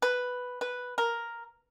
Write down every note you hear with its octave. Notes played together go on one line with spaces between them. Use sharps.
B4
B4
A#4